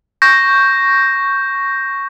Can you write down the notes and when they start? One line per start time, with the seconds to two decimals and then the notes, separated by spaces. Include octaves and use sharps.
0.22 C#6 G6 A#6